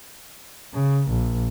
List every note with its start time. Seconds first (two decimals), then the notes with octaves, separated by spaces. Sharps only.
0.74 C#3
1.08 A#1